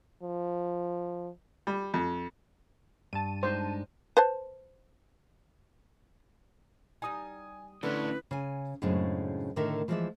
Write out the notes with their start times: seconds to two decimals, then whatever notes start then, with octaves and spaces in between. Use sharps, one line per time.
0.23 F3
1.67 G3
1.94 F2
3.13 G2 A5 D#7
3.43 G#3 D4 D#4 C5
4.17 B4 C5 A5
7.02 G3 D#4 G#5 D#6
7.83 A2 D3 C#4 D4 E4 B4
8.31 C#3 G#5
8.82 F#2 A2 C#3 G#3 C4 D4
9.56 A2 D3 D#3 A3 A#4 E5
9.88 E3 F3 G#3 A#4 D5 E5